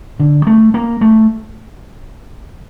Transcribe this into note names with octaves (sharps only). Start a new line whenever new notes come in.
D3
A3
A#3
A3